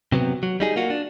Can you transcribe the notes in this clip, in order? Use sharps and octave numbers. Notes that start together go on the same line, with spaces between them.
C3 F#3 B3
F#3
G3 D#4 G#4
A#3 F4 F#4
D4